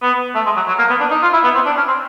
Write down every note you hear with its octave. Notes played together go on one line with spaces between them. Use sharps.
B3
A3
G#3
F#3
F#3
A#3
B3
D4
D#4
F4
E4
B3
C4
D4
C#4
C4